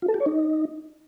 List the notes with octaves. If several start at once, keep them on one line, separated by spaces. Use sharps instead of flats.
F4
A4
G4
C#5
D#4